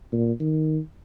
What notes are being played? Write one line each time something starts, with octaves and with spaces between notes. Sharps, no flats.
A#2
D#3